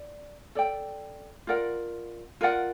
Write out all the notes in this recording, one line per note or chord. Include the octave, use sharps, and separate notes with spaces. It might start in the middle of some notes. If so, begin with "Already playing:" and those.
Already playing: D5
A4 D5 G5
F4 A#4 D5 F#5
F4 A#4 D5 F#5